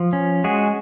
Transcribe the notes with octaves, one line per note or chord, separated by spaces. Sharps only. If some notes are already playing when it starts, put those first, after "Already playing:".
Already playing: F3
C#4
G#3 F#4 G#4